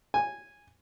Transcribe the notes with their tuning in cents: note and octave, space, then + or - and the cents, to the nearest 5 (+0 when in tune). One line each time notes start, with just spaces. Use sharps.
G#5 -10